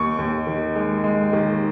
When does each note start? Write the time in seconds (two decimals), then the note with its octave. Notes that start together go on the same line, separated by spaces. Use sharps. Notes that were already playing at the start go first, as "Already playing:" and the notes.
Already playing: D#2 C#6
0.19 D#2
0.47 D#3
0.75 G#3
1.04 G#3
1.33 D#3